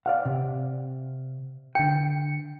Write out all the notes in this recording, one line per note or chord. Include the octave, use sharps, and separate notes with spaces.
D5 F5 F#5
C3
D3 G5 C#7